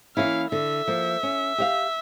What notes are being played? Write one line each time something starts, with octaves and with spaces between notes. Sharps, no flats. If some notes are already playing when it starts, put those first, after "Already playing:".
E3 A#3 C#4 E4 F5
D3 E5
F3 A#3
C#4
G4 D5 F5